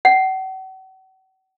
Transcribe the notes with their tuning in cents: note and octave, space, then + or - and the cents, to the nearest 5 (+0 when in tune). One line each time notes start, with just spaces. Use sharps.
F#5 +40